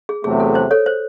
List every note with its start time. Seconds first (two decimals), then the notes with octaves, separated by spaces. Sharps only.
0.09 G#4
0.24 E2 C3 F#3 A3 G#4
0.40 A4
0.55 C5
0.71 A4 C#5
0.86 C5